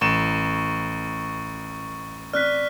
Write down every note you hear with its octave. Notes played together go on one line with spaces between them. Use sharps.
A1 C#6 E7
C4 D5 F6 F#6 B6